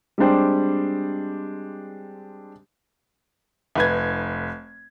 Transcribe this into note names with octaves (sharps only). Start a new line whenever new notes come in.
G3 G#3 C4 D4 C5 G5
F1 B4 G#6